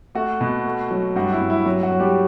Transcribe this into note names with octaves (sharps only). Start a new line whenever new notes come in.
A3 F#4
B2
A3
F#3
G2 F#4
E4
G2
E4
F#3
F#4
F#3
G3 G4